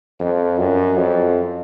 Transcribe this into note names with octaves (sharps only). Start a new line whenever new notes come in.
F2
F#2
F2